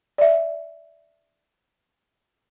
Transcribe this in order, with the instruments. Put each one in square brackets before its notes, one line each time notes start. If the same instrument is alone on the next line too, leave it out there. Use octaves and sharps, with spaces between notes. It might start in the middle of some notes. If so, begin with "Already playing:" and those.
[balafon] D5 E5